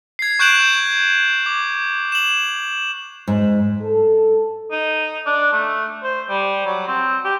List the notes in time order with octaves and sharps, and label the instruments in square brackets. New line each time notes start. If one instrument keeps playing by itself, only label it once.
[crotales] G#6 C7
C#6 F#6 G6 D7 E7 F#7
D6
E7 F#7
[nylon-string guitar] G#2
[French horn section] A4
[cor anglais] D#4
D4
A3
C5
G3
F#3
C4
G4